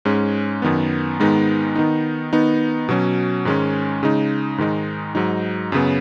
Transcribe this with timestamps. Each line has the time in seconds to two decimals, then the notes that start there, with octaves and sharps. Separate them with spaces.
0.05 G#2 G#3 C#4
0.62 F#2 D#3 B3
1.19 G#2 D#3 G#3 B3 D#4
1.76 D#3 B3 D#4
2.33 D#3 B3 D#4
2.89 B2 F#3 C#4
3.45 G#2 D#3 G#3 C#4
4.03 C#3 G#3 D#4
4.58 G#2 D#3 G#3 D#4
5.15 G#2 F#3 D#4
5.72 F#2 C#3 B3